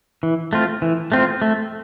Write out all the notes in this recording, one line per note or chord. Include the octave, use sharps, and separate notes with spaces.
E3
A3 C4 F4
E3
A3 C4 F4
A3